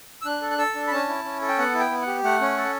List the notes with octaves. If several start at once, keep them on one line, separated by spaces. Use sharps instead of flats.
E6
D4 F#6
A4
F#6
A4 E6
D4
B5
C#4 A5
E4
C#4
A4
G5
B3 F#5
E4
G5
B3
F#5
G4
A3 F#5
C#4
A4